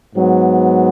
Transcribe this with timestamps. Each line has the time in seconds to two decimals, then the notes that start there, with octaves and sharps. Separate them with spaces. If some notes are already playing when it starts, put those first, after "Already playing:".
0.15 G#2 F#3 B3